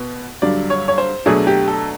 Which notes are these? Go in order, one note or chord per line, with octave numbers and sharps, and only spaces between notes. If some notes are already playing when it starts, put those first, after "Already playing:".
Already playing: B2 B3
G2 D3 F#3 D5
C#5
C#5
C5
B2 F#3 A3 D4 G#4
G4
A4